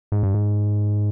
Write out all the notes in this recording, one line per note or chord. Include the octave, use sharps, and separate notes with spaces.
G#2
G2
G#2